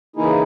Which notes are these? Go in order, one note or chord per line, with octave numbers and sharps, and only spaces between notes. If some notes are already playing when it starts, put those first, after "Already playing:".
C#3 E3 A#3 D#4 E4 G#4